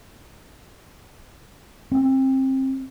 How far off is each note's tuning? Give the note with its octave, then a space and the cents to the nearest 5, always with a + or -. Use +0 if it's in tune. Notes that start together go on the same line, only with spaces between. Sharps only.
C4 +25